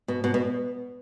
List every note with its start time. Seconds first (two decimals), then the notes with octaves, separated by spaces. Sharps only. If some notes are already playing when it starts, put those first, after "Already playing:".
0.08 B2
0.24 B2
0.34 B2